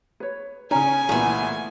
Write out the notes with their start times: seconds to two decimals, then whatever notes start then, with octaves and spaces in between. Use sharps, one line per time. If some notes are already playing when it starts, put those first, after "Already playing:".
0.20 B4 C#5
0.71 C#3 C#4 G#5 A#5
1.09 C2 A#2 E3 A3 B3